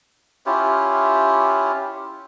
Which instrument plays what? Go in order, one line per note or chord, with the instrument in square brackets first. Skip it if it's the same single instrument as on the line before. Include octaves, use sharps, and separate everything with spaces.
[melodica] C#4 E4 F4 G4